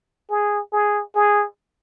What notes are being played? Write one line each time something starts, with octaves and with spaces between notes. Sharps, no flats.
G#4
G#4
G#4